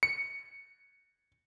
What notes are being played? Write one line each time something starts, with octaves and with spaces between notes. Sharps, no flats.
C#7